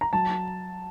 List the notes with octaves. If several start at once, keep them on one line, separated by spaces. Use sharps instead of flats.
A#5
F#3 A5